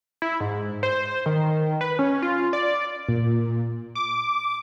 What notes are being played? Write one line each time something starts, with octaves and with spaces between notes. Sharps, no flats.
E4
G#2
C5
D#3
B4
C#4
F4
D5
A#2
D6